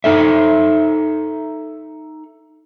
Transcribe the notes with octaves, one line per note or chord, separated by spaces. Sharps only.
D#4 A4 E5